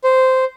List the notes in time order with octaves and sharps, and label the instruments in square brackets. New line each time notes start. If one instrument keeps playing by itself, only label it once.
[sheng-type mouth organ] C5